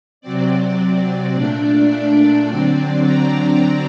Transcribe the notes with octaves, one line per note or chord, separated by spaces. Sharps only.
C3 F#3 C4 D5
A#2 A3 D4
D5
D3 F#3 C4
A#5